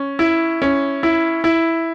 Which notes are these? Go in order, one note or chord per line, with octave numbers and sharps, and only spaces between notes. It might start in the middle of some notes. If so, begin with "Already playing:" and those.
Already playing: C#4
E4
C#4
E4
E4